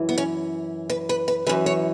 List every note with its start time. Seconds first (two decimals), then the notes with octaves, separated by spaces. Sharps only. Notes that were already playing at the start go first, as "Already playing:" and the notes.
Already playing: F#2 E3
0.09 B3
0.18 C#4
0.90 B4
1.09 B4
1.28 B4
1.47 F#2 E3 B4
1.66 C#5